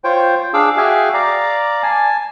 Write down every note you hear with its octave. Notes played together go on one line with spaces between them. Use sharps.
F4 C5 C#5 G5
D4 G#4 F5 D6 E6
F#4 G#4 E5 F5 G5 G#5
D5 F5 A#5 D6
G#5 A5